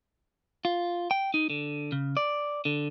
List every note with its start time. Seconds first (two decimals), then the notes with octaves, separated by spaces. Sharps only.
0.65 F4
1.11 G5
1.34 D#4
1.50 D3
1.92 C#3
2.17 D5
2.65 D3